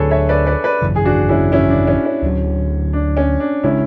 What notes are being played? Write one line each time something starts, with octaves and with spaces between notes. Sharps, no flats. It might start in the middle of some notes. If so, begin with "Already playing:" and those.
Already playing: D2 D3 F#3 D4 G#4 A4 B4 C#5
C#5 E5
B4 D5
B4 D5
B4 D5
G#1 F#2 C#3 E3
G#4
D4 F#4
C#4 E4
C#4 E4
D4
C#4
C#4
D2 D3 F#3
D4
C#4
D4
C#3 G#3 C#4 D4 E4